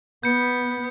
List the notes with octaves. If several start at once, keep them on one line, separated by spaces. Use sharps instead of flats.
B3 G6 C#7